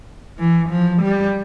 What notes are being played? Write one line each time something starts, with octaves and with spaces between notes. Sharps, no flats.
E3
F3
G3